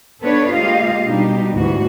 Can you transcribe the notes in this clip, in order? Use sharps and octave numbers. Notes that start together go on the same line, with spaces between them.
B3 D4 A4 B4 C#5
G#3 A#3 F4 G4 D#5 F5
B2 G3 D4 D#4 G4
D2 G#2 E3 F#4